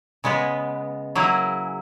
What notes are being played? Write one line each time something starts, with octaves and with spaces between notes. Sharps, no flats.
C#3 G#3 B3
F#3 A#3 E4 G#4